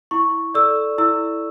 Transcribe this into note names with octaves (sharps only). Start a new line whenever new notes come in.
E4 C#6
A4 D5 E6
E4 E6